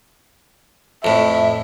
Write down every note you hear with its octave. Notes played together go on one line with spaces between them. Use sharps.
F2 A2 E5